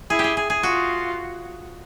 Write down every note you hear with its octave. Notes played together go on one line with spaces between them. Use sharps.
E4 G#4
G4
G#4
G#4
G#4
F4 F#4